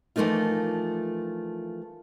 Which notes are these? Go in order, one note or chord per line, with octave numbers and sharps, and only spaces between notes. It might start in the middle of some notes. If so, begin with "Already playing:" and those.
E3 F3 A3 A#3 D#4 F4